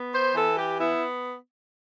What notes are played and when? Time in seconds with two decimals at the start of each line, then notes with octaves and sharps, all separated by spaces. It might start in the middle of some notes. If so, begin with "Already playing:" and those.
Already playing: B3
0.13 C5
0.35 E3 A4
0.56 G4
0.79 B3 E4